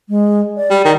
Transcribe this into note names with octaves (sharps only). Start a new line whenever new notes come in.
G#3
D5
G3
D#3